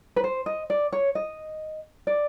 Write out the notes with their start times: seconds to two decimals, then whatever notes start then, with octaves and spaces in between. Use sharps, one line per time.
0.16 B4
0.24 C5
0.46 D#5
0.70 D5
0.92 C#5
1.15 D#5
2.07 D5